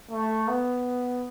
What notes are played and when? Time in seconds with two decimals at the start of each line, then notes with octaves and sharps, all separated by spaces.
0.11 A3
0.48 B3